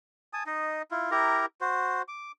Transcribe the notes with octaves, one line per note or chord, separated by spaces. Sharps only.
G#5 A5 D#6
D#4 D#5
E4 F4
E4 G4 A#4 A#5
F#4 C5
D6